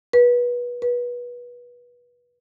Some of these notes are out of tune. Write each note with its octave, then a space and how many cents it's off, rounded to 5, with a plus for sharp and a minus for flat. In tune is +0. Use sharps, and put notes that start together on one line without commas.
B4 -25
B4 -25